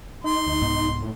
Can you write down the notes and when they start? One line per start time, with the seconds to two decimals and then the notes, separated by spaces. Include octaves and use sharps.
0.24 D#4 C6
0.47 D2
0.62 C2 G#2 B3
1.02 A2